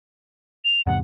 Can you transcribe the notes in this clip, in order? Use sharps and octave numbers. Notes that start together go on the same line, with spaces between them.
F7
E2 G#2 C3 F#5